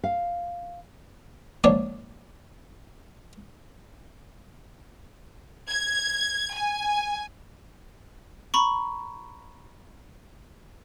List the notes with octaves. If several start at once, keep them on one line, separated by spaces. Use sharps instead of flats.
F5
A#1 G#2 D4 C#5 D5
G#6
G#5
A#5 B5 C#6